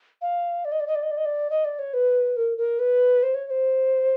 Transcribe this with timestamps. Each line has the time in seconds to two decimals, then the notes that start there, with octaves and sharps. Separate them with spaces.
0.22 F5
0.65 D5
0.72 D#5
0.80 D5
0.87 D#5
0.95 D5
1.03 D#5
1.11 D5
1.17 D#5
1.25 D5
1.50 D#5
1.65 D5
1.79 C#5
1.94 B4
2.36 A#4
2.58 A#4
2.79 B4
3.23 C5
3.34 C#5
3.47 C#5
3.50 C5